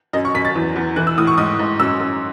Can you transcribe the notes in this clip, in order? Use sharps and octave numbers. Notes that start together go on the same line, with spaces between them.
F#2 D#5
C#6
F#2 B6
A6
E2
E2
E3 F#6
E6
A2 D#6
C#6
G#2 D#6
G#2
F#2 E6
F#2